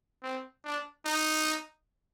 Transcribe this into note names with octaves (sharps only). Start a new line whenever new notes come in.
C4
D4
D#4